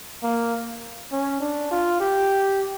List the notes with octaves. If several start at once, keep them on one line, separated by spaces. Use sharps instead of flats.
A#3
C#4
D4
F4
G4